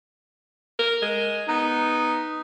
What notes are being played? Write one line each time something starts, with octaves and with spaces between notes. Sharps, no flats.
A#4
G#3
B3 D#4